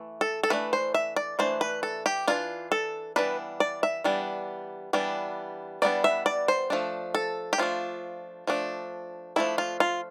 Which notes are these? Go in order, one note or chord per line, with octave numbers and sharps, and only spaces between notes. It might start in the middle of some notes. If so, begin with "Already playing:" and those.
Already playing: E3 A3
A4
A4
E3 A3 D4 B4
C5
E5
D5
E3 A3 D4 C5
B4
A4
G4
E3 A3 D4 F4
A4
E3 G3 B3 D4 B4
D5
E5
E3 G3 B3 D4
E3 G3 B3 D4
E3 G3 B3 D4 D5
E5
D5
C5
F3 A3 D4
A4
G4
F3 A3 D4 F4
F3 A3 D4
F3 A3 D4 E4
F4
F4